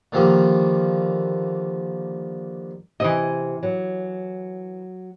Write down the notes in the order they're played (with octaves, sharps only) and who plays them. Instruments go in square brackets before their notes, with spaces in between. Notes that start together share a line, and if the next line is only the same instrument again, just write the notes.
[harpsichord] D3 D#3 F3 G3 A#3
[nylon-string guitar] C3 [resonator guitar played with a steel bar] E3 D#5
[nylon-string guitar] F#3